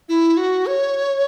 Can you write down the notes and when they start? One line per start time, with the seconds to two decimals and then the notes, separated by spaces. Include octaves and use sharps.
0.09 E4
0.37 F#4
0.66 C#5